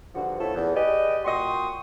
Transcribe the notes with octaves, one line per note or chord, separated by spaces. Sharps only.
G2 D3 F3 F#4
A3 C4 C#4 E4 F4 A4
E2
G4 G#4 B4 D5 D#5
A#2 F#4 G5 C6 C#6 D#6